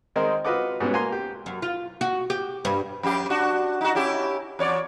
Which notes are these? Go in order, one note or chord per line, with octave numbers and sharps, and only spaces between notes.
D#3 G#3 C4 D#4 A#4 C5
F4 F#4 B4 D#5 F#5 D6
G#2 B2 G3 B3 C#4
A#3 G#5 A#5 C6
G4
F#2
F4
F#4
G4
G2
F2 G4
D4 F#4
D#4 F#4
C#4 E4 G4
E2 C#5 D5